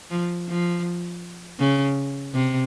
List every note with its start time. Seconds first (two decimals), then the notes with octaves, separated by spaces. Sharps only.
0.10 F3
0.48 F3
1.59 C#3
2.34 C3